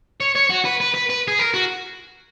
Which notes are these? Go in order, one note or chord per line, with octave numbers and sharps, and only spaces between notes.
C#5
C#5
F#4
B4
B4
B4
B4
G#4
A#4
F#4